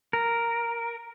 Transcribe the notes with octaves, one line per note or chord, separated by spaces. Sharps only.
A#4